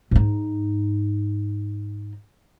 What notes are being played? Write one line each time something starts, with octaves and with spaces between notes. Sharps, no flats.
G#2 D#4